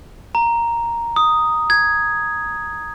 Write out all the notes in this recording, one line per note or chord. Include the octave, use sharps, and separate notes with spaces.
A#5
D#6
G#6